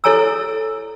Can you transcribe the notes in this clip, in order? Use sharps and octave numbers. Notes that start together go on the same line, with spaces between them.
E4 A4 C#5 G#5 A#5 E6